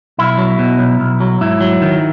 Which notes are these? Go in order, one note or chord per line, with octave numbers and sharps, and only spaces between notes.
B1 E4
F#3
B2
B1
B1
F#3
G#2 E4
F#3
D#3